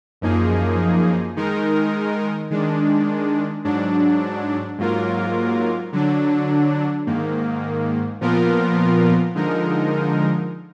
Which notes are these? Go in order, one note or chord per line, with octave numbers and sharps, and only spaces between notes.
F#2 F3 A#3 D#4 G#4
D#3 G#3 D#4 A#4
D#3 G#3 D4
G#2 F#3 D4
G#2 F#3 A#3 F4 A#4
D3 F#3 D4
G#2 D#3 A#3
A#2 F3 B3 F4 A#4
D3 F3 G#3 D#4 A#4